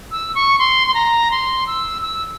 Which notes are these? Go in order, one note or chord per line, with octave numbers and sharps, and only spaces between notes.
E6
C#6
C6
C6
A#5
C6
E6
E6